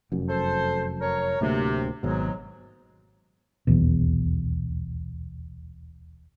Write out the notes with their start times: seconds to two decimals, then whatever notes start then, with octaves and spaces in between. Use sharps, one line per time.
0.12 F1 F#2
0.28 A4 C5
1.00 A#4 C#5
1.41 D1 D2 C3 A#3
2.03 G#1 G#2 B2 F#3
3.67 D#1 B1 E2 B2